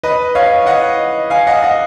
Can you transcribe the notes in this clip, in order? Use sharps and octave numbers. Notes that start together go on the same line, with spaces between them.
B4 D#5
C#5 F5
D#5 F#5
F5 G#5
D#5 F#5
D#5 F#5